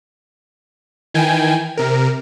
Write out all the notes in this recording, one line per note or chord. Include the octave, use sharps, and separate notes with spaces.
D#3 E3 G5 G#5
C3 A#4